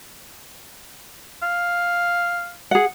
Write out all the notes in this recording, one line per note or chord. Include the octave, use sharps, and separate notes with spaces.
F5
G#4 F#5